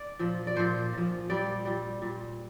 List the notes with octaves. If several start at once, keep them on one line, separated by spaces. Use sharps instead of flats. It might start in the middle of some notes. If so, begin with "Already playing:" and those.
Already playing: D5
A#2 F3
D5
A#2 F3 C5
A#2 F3
A#2 G3 D5
A#2 G3
A#2 G3